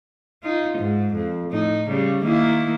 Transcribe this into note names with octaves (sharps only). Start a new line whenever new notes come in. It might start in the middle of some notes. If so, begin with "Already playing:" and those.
D#4 F4
G#2
F2
A2 D#4
C#3 G3
D#3 A#3 E4